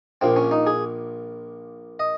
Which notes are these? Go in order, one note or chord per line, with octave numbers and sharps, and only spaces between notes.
A#1 A#2 C4
C#4
D#4
G#4
D#5